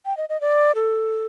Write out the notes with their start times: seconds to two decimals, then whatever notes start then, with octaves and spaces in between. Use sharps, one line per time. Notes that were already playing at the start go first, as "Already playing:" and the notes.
0.06 G5
0.17 D#5
0.29 D#5
0.41 D5
0.75 A4